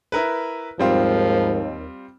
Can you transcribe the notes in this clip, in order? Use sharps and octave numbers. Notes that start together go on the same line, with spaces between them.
E4 A#4 B4
D#2 G#2 F3 G3 C4 F4